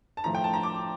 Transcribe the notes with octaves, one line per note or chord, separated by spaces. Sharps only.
A5
A2 F3 A3 A#5
G5
A5
A#5
D6